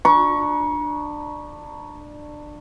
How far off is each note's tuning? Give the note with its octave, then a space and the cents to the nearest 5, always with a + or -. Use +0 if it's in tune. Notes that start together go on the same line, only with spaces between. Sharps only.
D4 +20 A#5 +45 C#6 +0